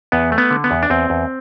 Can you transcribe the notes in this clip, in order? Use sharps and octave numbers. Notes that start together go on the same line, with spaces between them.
E2 B3
A3
B3
D3
B3
E2
D4
E2 C4
E2